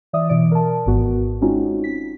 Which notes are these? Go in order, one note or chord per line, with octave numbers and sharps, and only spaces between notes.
E3 D5 E5 D#6
B2 E3 D5 D7
A#4 A5
G#1 G#2 B3 F#4
G#3 C4 C#4 D#4 F4 F#4
B6